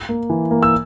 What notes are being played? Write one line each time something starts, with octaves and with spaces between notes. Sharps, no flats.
A#3
E3
A#3
E6